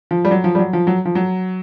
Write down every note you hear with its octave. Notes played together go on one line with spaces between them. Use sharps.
F3
G3
F#3
F3
G3
F#3
F3
F#3
F3
F#3